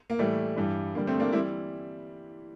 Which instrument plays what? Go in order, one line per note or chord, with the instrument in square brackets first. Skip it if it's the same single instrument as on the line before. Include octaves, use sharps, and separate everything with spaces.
[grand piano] A#3
A2 E3 G3 A3
G2 E3 G3
G2 D3 G3 A#3
A3 C4
A#3 D4
E3 G3 C4 E4